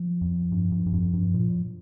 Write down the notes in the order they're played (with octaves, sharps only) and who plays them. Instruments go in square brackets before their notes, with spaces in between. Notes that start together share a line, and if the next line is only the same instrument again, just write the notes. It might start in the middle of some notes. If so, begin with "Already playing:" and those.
Already playing: [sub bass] F3
[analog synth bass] F2
G2
G2
G2
F2
G2
A#2